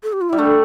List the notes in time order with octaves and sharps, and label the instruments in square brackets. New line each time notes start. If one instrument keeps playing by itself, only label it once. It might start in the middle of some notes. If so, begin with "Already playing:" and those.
[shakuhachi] A4
G4
F4
[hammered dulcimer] G3 [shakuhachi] E4
[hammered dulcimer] A3 [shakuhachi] D4